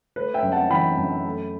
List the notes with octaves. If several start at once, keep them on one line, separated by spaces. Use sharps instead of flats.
A3 B4
E5 G5
F#2
F#5 A5
E3 G5 B5
F#2
A3